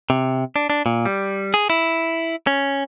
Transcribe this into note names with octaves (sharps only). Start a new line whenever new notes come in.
C3
D4
D4
A#2
G3
G#4
E4
C#4